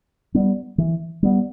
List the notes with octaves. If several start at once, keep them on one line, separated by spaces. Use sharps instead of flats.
G3 B3
E3
G3 B3